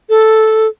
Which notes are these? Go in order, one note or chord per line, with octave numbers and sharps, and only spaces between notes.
A4